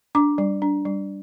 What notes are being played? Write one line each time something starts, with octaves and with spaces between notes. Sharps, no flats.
D4 D6
G3
D4
G3